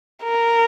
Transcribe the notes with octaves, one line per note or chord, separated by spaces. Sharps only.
A#4